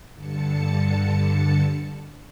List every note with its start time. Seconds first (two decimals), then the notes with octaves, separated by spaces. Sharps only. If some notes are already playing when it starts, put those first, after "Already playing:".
0.14 G2 D3 A5 C#7